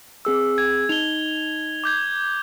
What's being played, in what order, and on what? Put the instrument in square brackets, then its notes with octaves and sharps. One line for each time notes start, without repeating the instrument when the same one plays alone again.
[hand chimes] C4 G#4 E6
[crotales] G#6
[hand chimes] D#4 [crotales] F7 G7
[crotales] D6 G6 G#6